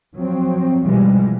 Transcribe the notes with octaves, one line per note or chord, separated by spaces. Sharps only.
F3 F#3 C4
B2 E3 F3 G3 G#3